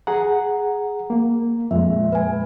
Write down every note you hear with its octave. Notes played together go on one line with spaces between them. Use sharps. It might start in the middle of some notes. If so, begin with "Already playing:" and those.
G#4 F#5 A#5
A#3
F2 A#2 G#3 E5
B4 G#5